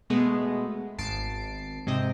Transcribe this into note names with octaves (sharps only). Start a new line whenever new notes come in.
B2 G#3 A3 B3
G#1 A5 C7 D7
G#2 C3 C4 D#5